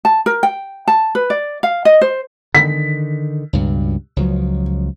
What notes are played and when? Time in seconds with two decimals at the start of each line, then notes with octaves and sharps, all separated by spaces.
0.05 A5
0.26 A#4
0.43 G5
0.88 A5
1.15 B4
1.30 D5
1.63 F5
1.85 D#5
2.01 C5
2.55 D3 D#3 B6
3.53 C#2 G2 B2
4.16 C#2 F3 F#3